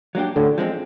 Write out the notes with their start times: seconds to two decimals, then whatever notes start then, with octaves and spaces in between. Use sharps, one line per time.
0.15 F#3 A#3 D4 G4
0.36 A2 D3
0.58 F3 G#3 C4